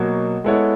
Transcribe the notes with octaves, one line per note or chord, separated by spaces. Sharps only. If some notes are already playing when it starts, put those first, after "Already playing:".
Already playing: B2 F#3 A#3
G#3 B3 E4 A4 C#5